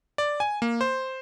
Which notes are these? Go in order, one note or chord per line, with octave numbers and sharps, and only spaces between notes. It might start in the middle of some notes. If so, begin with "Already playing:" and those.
D5
G#5
A#3
C5